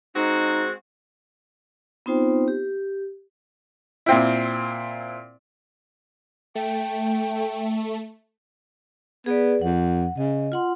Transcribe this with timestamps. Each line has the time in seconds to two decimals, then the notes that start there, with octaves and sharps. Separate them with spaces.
0.15 G#3 C4 D#4 F#4
2.06 B3 C4 D#4 F4 C5 G5
2.48 G4
4.06 A#2 C4 E4
6.55 A3 G5
9.26 B3 G#4 B4 D5
9.61 F2 F#5
10.17 C#3 D#5
10.52 F4 F#5 C6